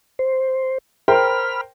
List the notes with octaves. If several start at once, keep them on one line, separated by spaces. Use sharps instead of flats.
C5
A#4 C5 G5 B5 F6